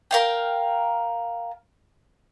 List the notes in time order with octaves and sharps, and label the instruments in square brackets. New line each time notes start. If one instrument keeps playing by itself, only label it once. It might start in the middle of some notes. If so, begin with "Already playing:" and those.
[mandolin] A#4 F5 G5